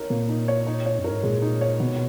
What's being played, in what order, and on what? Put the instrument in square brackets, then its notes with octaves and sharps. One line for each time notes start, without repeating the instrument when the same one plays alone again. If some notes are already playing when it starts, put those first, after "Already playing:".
Already playing: [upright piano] D#4 A#4 C#5
[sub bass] A#2 [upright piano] A#3
[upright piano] D#4
C#5
D#4
C#5
[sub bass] F#2
[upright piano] A#4
[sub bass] G#2
[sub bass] A#2 [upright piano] G#3
[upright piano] D#4
C#5
[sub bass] B2 [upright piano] B3